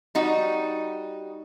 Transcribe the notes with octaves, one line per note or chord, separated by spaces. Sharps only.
G3 D#4 F#4